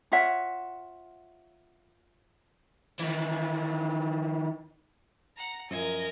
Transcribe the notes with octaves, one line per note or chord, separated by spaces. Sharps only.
F4 C#5 E5 F#5
D#3 E3
F#5 A#5
F#2 F3 A#4 D#5 G#5